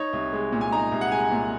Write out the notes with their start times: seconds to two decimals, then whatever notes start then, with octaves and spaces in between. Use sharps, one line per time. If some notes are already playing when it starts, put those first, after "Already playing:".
Already playing: D#4 C#5
0.13 C2
0.33 G#3
0.52 A#2
0.61 G#5
0.72 D#4 A#5
0.92 C2
1.01 F#5
1.12 G#3 G#5
1.31 A#2